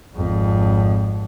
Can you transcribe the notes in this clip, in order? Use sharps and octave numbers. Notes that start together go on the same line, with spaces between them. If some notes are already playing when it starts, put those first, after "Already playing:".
G#1 F2